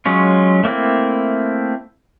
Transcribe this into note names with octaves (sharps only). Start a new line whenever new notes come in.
F#3 G#3 C#4 F4
A3 A#3 C4 E4